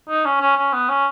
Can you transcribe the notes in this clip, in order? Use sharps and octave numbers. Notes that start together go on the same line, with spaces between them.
D#4
C#4
C#4
C#4
B3
C#4